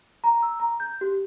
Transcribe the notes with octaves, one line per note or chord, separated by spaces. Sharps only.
A#5
E6
A#5
G6
G4